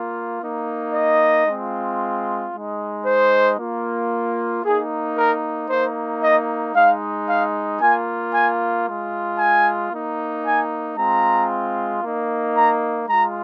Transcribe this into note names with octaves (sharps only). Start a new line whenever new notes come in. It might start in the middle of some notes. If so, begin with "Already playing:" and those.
Already playing: A#3 F4
A#3 D#4
D#5
G#3 C4 F4
G#3 D#4
C5
A#3 F4
A#3 D#4 G#4
A#4
A#3 D#4 C5
D#5
G#3 D#4 F5
F5
A#3 F4 G#5
G#5
G#3 F4
G#5
A#3 D#4
G#5
G#3 C4 F4 A#5
A#3 D#4
A#5
G#3 F4 A#5